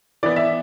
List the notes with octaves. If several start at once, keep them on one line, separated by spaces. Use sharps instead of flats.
E3 B3 D5
E5